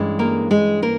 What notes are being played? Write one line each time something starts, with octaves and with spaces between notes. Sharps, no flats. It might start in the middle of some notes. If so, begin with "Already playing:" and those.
Already playing: G2 E3 G#3 C#4
A#3 A#4
G#3 G#4
A#3 A#4